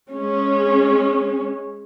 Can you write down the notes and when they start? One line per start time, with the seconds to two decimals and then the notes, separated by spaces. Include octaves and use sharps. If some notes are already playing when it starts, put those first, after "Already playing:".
0.12 G#3 C#4